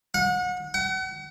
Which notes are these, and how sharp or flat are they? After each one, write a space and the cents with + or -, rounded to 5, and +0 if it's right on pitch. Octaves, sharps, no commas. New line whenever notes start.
F#5 -35
F#5 +35